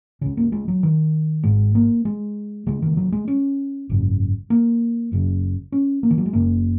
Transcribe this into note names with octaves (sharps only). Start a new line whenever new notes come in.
C#2 C#3 C#4
A#3
G#3
F#3
D#3
G#1 G#2 G#3
A#3
G#3
C#2 C#3 G#3
D#3
F#3
G#3
C#4
G#1 F#2 C#3
A#3
F#1 F#2 C#3
C#4
A#3
D#3
F#3
G#3
F#1 F#2 C#3 A#3